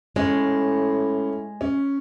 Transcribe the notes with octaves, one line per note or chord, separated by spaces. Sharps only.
A2 G#3 C#4
C#4